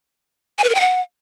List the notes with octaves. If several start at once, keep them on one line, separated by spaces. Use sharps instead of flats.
G#5
B4
A#4
G5
F#5